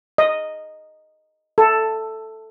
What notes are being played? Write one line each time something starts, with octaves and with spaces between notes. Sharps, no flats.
D#5
A4